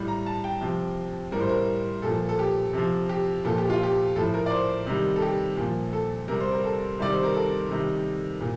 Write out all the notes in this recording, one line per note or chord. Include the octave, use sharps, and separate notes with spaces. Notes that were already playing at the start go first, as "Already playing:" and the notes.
Already playing: A2 G3
A#5
A5
G5
C3 F3
A2 G3 A#4
C5
A#4
A#2 F3 A4
A4
G4
C3 F3
G4
A#2 F3 A4
G4
F4
G4
A2 F3 A4
A#4
D5
C5
C3 D#3 G3
A4
G4
A#2 F3
A4
C3 G3 A#4
C5
A#4
A4
C3 D#3 G3 D5
C5
A#4
A4
C3 D#3 G3
A#2